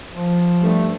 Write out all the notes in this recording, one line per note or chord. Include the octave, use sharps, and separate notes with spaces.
F3
G2 A3